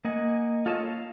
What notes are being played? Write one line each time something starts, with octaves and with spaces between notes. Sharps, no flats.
A#3 D#5 F#5 G#5
F4 A4 C#5 D#5 A5
F5